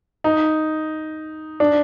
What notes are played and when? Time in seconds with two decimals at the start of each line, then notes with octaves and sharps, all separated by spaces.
0.24 D#4
1.60 D4